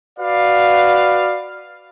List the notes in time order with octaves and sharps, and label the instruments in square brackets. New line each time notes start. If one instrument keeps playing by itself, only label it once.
[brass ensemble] F#4 B4 D5 F5